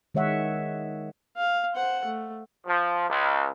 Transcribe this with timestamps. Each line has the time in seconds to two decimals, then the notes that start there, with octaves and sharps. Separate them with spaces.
0.15 D#3 G#3 C#5 E5 F#5
1.37 F5
1.74 C5 F#5
2.05 A3
2.66 F3
3.08 C#2